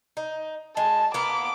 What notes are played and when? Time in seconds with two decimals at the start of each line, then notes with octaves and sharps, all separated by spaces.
0.17 D#4
0.77 G#3 A5
1.14 A#3 B3 D6